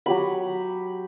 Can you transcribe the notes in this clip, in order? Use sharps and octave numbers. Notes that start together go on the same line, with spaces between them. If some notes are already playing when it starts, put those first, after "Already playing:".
F#3 G4 B5